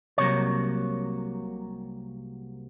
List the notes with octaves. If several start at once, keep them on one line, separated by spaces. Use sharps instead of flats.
C2 C3 F#3 A#3 C#5